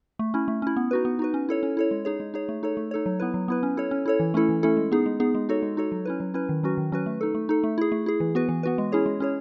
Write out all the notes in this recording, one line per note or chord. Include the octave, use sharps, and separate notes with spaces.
A3
C#4 E4
A3
C#4 E4
B3
D#4 F#4 B4
B3
D#4 F#4 B4
C#4
E4 A4 C#5
C#4
E4 A4 C#5
G#3
D#4 G#4 C#5
G#3
D#4 G#4 C#5
A3
D#4 A4 C#5
A3
D#4 A4 C#5
F#3
B3 E4 B4
F#3
B3 E4 B4
C#4
E4 A4 C#5
C#4
E4 A4 C#5
E3
A3 C#4 E4 A4
E3
A3 C#4 E4 A4
G#3
B3 D#4 G#4
G#3
B3 D#4 G#4
G#3
D#4 F#4 A4 C#5
G#3
D#4 F#4 A4 C#5
F#3
C#4 E4 B4
F#3
C#4 E4 B4
D#3
F#3 C#4 F#4 B4
D#3
F#3 C#4 F#4 B4
A3
D#4 A4
A3
D#4 A4
A3
E4 G#4
A3
E4 G#4
E3
B3 F#4 B4
E3
B3 F#4 B4
G#3
C#4 E4 G#4 C#5
G#3
C#4 E4 G#4 C#5